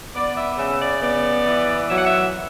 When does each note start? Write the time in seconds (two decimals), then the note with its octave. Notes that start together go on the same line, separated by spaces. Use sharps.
0.15 B3 D5
0.37 E5
0.59 C#3 E5
0.81 D5
1.03 B3 D5
1.46 E3
1.90 F#3 E5
1.98 F#5
2.06 E5